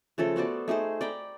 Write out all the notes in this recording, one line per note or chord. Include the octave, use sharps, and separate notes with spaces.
C#3 F3 A3 A4
B3 F#4 C5 D5
A3 D#4 G#4 C5
D5 G5 A#5 B5